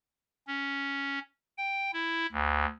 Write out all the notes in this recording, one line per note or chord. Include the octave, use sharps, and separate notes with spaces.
C#4
G5
E4
D2